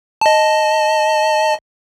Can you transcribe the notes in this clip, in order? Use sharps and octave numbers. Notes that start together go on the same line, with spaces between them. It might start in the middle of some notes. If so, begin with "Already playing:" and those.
D#5 A5